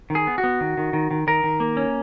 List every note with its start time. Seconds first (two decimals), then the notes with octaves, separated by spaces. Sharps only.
0.10 D#3
0.15 G#4
0.27 B3
0.38 F#4
0.44 B3
0.60 D#3
0.77 D#3
0.93 D#3
1.11 D#3
1.27 D#3 A#4
1.44 D#3
1.60 A#3
1.77 C#4